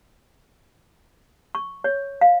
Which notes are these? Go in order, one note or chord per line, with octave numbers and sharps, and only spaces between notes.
C#6
C#5
F5